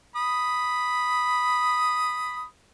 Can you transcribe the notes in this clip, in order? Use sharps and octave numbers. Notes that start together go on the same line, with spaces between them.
B5 D#6